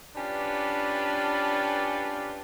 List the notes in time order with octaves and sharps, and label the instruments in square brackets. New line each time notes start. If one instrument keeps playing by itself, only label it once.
[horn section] C#4 D4 F4 G4 B4